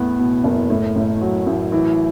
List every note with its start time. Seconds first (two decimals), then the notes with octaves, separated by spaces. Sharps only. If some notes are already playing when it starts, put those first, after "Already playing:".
Already playing: E2 A2 B3
0.19 B2
0.44 F#1
0.70 A2
0.96 A1
1.21 F#3
1.47 A1
1.72 E3